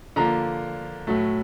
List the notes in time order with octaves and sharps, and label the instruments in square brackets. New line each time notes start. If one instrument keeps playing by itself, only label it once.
[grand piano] D3 F3 A#3 A#5
A2 F#3 A3